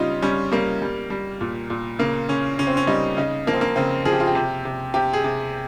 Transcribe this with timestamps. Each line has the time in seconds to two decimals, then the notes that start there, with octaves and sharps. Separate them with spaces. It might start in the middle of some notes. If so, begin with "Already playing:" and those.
Already playing: C#3 G3 C#4 D#4 F4
0.22 G3 C#4
0.52 G3 A#3
0.82 G3
1.10 G3
1.41 A#2
1.70 A#2
1.99 C#3 A#3
2.28 C#3 C#4
2.58 C#3 C#4
2.67 C4
2.77 C#4
2.87 G3 D#4
3.17 C#3 D#4
3.47 F3 A#3
3.53 C4
3.61 A#3
3.76 C#3 C4
4.05 F3 G#4
4.13 G4
4.20 F4
4.27 G4
4.35 C3
4.65 C3
4.94 C3 G4
5.13 G#4
5.24 C3